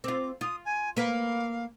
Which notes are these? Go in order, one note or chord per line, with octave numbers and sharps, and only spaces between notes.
C4 F4 D6
F4 D#6
G#5
A#3 B4 F5